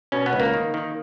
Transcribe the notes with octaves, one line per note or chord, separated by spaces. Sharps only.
B2 C#4
B3
C#2
A#3
D#3
D#3